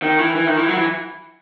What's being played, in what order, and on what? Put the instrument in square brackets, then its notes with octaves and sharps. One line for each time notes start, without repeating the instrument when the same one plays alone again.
[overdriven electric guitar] D#3
E3
E3
D#3
E3
F#3
E3